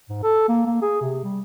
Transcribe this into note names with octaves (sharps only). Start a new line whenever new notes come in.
G#2
A4
A#3
A#3
G#4
C3
G3